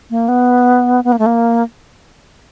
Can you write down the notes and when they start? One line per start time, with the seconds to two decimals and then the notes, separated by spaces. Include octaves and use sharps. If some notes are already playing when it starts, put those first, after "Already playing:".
0.10 A#3
0.28 B3
1.04 B3
1.12 A#3
1.19 A3
1.26 A#3